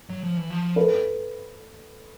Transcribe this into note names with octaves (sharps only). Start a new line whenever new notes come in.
F#3
F3
E3
F3
A4 B4